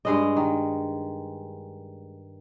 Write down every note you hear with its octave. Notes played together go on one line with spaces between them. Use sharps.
G2 G#3 D#5
D#3